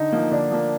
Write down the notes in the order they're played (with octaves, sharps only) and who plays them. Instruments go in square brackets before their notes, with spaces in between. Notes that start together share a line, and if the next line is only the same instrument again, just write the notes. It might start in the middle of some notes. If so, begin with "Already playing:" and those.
Already playing: [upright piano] D3 [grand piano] D#4
[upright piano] F3 A#3
[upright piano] D3 [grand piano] D4
[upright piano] F3 A#3